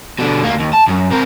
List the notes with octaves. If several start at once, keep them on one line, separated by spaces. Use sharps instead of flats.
B2 D3
D2 A#3
D#2
A5
F#2
C4 A#4